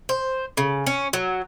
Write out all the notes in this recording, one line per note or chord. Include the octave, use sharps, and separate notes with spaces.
C5
C#3
C#4
F#3